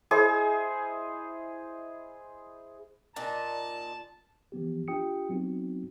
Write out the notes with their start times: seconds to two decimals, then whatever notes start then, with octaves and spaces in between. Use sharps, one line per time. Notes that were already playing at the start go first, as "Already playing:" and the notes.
0.11 E4 G#4 C5 D#5
3.16 A#2 D4 D#4 A5
4.52 E3 F3 B3 G4
4.88 D4 F4 G4 G5 D#6 C#7
5.29 F#3 B3 C4 D#4 F#4